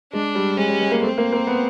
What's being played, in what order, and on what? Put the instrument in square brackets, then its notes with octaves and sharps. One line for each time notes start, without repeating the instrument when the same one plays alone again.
[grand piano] G#3 [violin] D4
[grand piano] G3
[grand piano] G#3 [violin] C#4
[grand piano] G3
G#3
A#3
[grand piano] A3 [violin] C4
[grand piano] A#3
A#3
B3